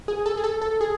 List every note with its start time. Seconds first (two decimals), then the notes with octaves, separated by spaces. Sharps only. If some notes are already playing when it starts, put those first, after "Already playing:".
0.08 G#4
0.26 A4
0.37 G#4
0.44 A4
0.62 A4
0.81 G#4